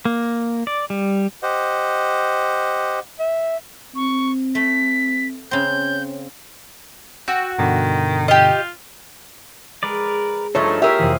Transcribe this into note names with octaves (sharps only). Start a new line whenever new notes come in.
A#3
D5
G3
G4 C5 D#5 F#5
E5
C4 C#6
A3 B6
C#3 C4 G6
F#4 G5 E6
G2 B2 D3 D#3
F4 G4 D#5
G#3 A#4 B4 D5
G2 F3 A3 D#4 F4 A4 C#5
A#3 E4 F4 G4 G#4 A#4 E5 F5
F2 C3 E3